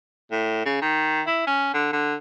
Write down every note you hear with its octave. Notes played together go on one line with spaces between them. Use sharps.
A2
C#3
D#3
E4
C#4
D3
D3